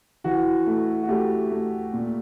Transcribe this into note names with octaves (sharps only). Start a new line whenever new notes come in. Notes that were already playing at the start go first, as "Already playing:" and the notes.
E3 F#4
A3
F#4
A3 G4
A3
A#2